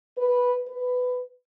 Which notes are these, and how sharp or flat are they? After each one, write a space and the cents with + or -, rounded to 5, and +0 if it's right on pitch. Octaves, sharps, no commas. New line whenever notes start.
B4 -5
B4 +15